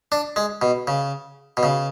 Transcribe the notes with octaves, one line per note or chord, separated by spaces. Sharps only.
D4
G#3
B2
C#3
B2
C#3